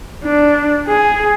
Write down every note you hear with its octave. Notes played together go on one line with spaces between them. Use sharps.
D4
G#4